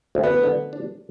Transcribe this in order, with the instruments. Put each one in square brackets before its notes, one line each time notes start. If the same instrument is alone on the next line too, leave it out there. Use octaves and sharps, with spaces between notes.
[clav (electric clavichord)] D2
[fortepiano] B3
[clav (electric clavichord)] D3
D4